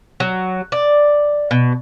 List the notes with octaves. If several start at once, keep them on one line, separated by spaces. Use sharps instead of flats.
F#3
D5
B2